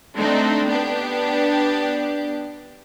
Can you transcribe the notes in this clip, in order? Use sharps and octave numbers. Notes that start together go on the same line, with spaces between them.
A3 C4 D4 D#4
B3 D4 G4